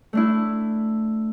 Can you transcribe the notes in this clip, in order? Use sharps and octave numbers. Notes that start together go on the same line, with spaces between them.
A3 D4 E4